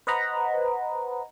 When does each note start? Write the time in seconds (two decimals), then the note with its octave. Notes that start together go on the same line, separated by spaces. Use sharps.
0.07 B4 C5 D#5 F#5 A#5 B5